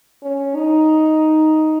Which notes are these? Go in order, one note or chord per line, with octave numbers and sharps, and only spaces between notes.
C#4
D#4